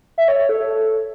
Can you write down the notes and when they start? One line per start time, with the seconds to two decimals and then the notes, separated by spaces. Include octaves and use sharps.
0.18 E5
0.28 C#5
0.39 C#5
0.49 A4